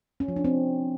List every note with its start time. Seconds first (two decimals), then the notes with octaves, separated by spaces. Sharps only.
0.20 C#4
0.28 F3
0.36 D4
0.45 C4